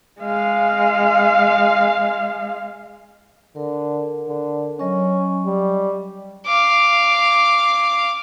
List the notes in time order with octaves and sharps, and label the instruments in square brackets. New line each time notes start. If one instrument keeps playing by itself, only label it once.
[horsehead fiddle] G#3 F5
[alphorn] D3 [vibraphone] A#4
[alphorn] D3
[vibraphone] F#3 D#5 C#6 [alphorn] C#4
[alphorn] G3
[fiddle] F5 D6